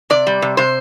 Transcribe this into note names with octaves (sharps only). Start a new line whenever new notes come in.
C3 D5
G3
C3
C3 C5